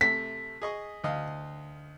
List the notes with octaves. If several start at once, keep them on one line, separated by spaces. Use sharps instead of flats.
C3 A3 B6
G#4 D#5 C#6
D2 D#5 F5